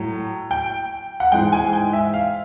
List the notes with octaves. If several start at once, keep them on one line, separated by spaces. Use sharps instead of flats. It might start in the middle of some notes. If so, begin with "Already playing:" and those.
Already playing: A2 F#3
G5
F#5
G#2 E3 G#3 G5
G#5
G5
E5
F5